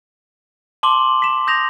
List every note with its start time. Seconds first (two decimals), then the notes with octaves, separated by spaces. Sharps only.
0.83 A5 C6 D6 F#7 G7
1.22 B6 E7
1.47 D#6 G6 A#6 E7 F7